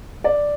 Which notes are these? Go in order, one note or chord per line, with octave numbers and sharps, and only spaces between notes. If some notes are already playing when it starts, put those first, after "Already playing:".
D5